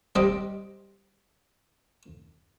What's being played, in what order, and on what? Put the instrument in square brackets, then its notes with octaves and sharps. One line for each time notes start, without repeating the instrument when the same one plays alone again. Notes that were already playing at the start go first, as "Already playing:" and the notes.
[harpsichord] G3 C4 D#5 D6